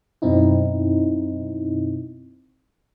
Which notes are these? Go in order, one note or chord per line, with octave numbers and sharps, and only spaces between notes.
F#2 B2 C4 D#4 E4